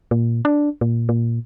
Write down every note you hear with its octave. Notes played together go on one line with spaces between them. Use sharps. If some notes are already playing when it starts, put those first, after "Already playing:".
A#2
D4
A#2
A#2